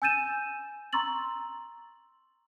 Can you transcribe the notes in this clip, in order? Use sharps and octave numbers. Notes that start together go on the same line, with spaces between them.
G#5 E6 G6 A6 D#7 E7
A#5 C6 C#6 E6 A6 F#7